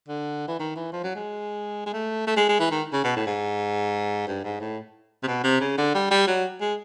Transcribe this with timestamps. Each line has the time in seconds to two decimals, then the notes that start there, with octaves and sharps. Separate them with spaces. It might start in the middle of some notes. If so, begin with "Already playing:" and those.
0.08 D3
0.48 E3
0.60 D#3
0.76 E3
0.92 F3
1.04 F#3
1.15 G#3
1.86 G#3
1.93 A3
2.27 A3
2.37 G#3
2.49 G#3
2.60 E3
2.71 D#3
2.93 C#3
3.04 B2
3.16 A2
3.26 G#2
4.28 G2
4.44 G#2
4.60 A2
5.23 C3
5.27 B2
5.44 C3
5.61 C#3
5.78 D3
5.94 G3
6.11 G3
6.27 F#3
6.61 G#3